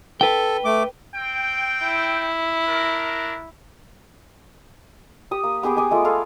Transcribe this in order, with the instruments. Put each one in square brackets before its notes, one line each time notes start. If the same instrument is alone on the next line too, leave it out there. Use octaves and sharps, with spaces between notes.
[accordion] A4 [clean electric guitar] B4 G5
[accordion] A3 D6
[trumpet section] C4 G5
[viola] E4
[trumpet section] D4 A#4
[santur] G4 D#6
A#3
B3 G4 G#4 D6
G5 G#5 D6 D#6
G#3 A3 F4
F4 G#4 A4 F5